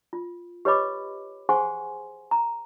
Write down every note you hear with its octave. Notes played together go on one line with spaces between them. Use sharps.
F4
G4 B4 C#5 D#5 B5 D6
G#4 C5 F#5 G#5 C6 C#6
A#5